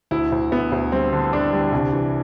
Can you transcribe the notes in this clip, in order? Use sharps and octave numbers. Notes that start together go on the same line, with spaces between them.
D2 E4
D2
D2 B3
D2
G3 C4
D3
D3 D4
G3
C2
E3